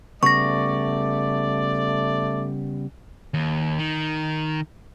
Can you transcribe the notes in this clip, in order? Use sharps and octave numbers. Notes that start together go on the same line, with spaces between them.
C#3 G3 A3 B3 D5 C#6 A#6
D#2
D#3